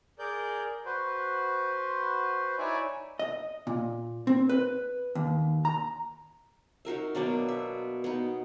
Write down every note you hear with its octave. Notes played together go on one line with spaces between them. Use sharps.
G#4 A#4 D5 G6
F#4 B4 C5
D#4 E4 C#5 D5 E5 G#5
D#5
A#2
C4
B4
D#2
A#5
D#4 F#4 A#4 E5
B2 F#3 A#3 D4
E5
B3 D#4